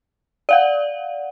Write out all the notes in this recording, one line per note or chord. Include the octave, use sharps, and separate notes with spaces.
D5 F5 F#5